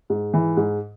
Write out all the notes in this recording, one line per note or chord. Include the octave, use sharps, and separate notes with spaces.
G#2
E3
G#2